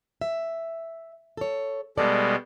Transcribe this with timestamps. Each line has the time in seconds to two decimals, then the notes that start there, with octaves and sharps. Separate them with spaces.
0.21 E5
1.37 A4 C#5
1.97 B2 G3 G#3 A4 D5